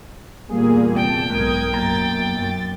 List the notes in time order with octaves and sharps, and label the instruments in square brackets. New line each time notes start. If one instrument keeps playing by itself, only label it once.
[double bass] E2 A#2 [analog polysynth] G3 A#3 G#4
[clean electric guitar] C3 [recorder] G5 [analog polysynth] A5
[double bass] B1 [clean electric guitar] G#2 [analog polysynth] A#4 D#6 G#6
[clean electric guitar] B1 A#3 A#5 [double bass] F#2 [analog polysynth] A6
[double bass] F#2